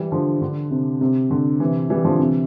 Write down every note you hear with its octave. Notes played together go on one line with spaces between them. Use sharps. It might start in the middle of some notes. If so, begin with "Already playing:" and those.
Already playing: E3 G3
D3 F3
D3
C3
C3
D3
C3 E3
E3 G3
D3 F3
C3 E3